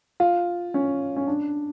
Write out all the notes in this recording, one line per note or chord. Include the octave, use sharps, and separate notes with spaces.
F4
C#4
C#4
D4